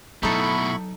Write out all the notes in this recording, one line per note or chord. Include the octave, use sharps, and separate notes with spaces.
B2 F#3 A3 D#4 E4 A4 B5 C#6